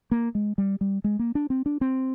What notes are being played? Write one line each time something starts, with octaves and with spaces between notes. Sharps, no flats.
A#3
G#3
G3
G3
G#3
A#3
D4
C4
D4
C4